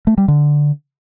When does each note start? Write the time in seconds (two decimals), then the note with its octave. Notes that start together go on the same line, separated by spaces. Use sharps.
0.07 A3
0.18 G3
0.28 D3